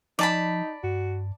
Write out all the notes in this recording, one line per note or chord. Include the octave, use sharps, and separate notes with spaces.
F3 D#4 D5 A5 B5
G2 F#4